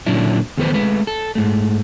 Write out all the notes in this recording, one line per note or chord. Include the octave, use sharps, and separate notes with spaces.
A#2 D3 F#3 C#4 D4 E4
E2 D#3 B3 A4 B4 C5
G#3 A3 B4
A4
G#2 A3